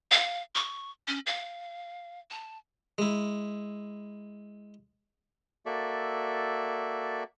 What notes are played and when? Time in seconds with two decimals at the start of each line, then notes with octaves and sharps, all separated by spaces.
0.11 F5
0.55 C#6
1.07 C#4
1.26 F5
2.31 A5
2.98 G#3 E4
5.66 A#3 F#4 A4 D5 E5